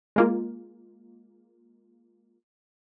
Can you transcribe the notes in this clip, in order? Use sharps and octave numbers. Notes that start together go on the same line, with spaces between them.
G#3 A#3 F4